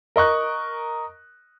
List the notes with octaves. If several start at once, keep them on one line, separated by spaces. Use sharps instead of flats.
A#4 D#5 C#6 F#6